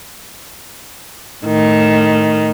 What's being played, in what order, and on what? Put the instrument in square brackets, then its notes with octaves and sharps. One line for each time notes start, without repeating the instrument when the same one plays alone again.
[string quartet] A2 D#3